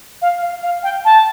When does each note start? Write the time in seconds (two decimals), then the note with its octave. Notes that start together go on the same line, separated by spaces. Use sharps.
0.22 F5
0.42 F5
0.63 F5
0.83 G5
1.05 A5